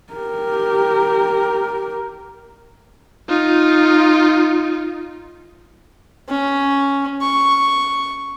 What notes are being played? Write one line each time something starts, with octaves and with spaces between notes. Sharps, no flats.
G4 A#4
D#4 F4
C#4
C#6